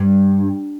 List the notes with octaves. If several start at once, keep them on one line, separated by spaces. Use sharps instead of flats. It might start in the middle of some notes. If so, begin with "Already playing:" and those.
Already playing: G2